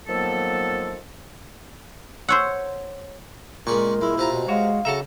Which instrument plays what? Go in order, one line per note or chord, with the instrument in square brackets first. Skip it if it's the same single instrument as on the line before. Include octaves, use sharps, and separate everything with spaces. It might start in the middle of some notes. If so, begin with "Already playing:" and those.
[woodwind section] D#3 F3 F#3 A#3 B3 A4
[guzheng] C5 C#5 F#5 [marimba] E6
[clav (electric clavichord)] A#2 [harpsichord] C#3 D5 C#6 [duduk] G#3 [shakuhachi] A#4
[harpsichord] G#3 [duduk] E4
[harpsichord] C3 A5 A#5 [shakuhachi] F4
[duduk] B2
[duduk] G#3 [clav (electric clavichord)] F#4 C#5 [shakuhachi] F5
[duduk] C#3 [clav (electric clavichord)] F#4 A4 E5 [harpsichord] A5 A#5